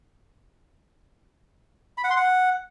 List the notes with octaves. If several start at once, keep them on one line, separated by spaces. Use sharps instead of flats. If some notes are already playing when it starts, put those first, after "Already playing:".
B5
F#5
C6
F#5